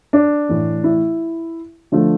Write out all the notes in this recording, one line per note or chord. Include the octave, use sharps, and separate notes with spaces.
D4
A2 E3 A3
E4
D3 F3 A3